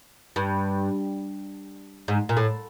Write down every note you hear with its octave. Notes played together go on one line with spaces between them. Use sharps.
G2
G#2
A#2
A2